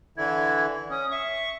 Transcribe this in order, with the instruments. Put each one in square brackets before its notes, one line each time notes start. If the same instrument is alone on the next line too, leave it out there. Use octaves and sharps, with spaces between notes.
[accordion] D3 E3 E4 [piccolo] G#6
[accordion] C#4 [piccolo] D#6
[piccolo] E5 [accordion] C#6